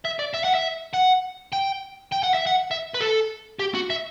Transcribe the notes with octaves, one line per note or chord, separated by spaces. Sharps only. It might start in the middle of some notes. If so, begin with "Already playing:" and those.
E5
D5
E5
F#5
E5
F#5
G5
G5
F#5
E5
F#5
E5
B4
A4
G4
F#4
E5